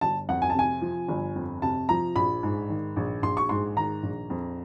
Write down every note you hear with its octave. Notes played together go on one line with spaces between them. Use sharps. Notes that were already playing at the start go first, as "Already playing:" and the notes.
G1 A5
F2 F#5
G#5
A5
C3 G#5
F3
G1
F2
C3 A5
F3 A#5
A#1 B5
G#2
D#3
A#1
A#1 C6
C#6
G#2 C6
D#3 A#5
A#1
F2